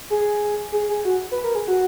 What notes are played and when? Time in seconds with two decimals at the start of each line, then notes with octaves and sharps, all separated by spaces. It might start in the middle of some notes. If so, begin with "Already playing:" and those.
0.10 G#4
0.72 G#4
0.89 G#4
1.05 F#4
1.32 B4
1.44 A#4
1.55 G#4
1.68 F#4